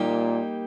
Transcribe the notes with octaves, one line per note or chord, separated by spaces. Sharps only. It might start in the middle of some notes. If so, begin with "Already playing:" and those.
Already playing: A#2 G3 A#3 D#4 G4